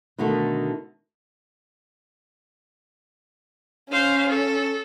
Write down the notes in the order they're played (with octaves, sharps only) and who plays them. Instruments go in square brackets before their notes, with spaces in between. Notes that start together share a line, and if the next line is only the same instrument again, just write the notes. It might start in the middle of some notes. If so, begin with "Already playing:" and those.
[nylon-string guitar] B2 D3 D#3 A3 A4
[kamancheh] C#4 [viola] C5 F5
[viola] A4